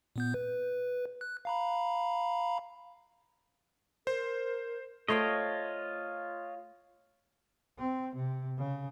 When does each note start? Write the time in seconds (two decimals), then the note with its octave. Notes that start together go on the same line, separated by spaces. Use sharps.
0.16 A#2 B3 G6
0.34 B4
1.21 F#6
1.45 F5 A#5 B5
4.07 A#4 C5
5.08 A3 F4 C5 C#5 D#5 G5
7.78 C4
8.16 C3
8.58 C#3